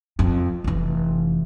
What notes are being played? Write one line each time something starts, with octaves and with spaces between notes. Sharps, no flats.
F2
F1 E3